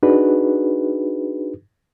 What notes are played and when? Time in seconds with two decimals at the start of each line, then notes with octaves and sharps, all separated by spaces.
0.03 D4 D#4 F#4 G#4 B4